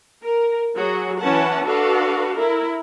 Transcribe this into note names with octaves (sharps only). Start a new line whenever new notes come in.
A#4
F#3 F#4 G#4
E3 C#4 B4 F#5 A5
D4 F#4 A4 B4 F5
E4 A#4